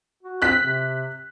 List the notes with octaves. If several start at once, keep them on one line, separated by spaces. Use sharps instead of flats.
F#4
C4 F#6 B6
C3